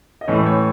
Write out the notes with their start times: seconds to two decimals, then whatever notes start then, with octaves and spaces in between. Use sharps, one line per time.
0.21 D#5
0.28 A2 E3 A3 C#4 C#5
0.46 C#5